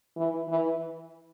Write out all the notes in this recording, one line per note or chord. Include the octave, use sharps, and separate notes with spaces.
E3
E3